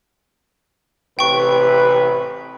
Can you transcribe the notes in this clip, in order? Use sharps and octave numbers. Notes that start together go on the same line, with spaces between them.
A1 C3 B4 G5 C#6